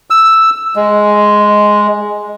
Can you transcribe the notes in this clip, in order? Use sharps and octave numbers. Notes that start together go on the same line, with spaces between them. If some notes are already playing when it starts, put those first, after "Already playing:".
E6
G#3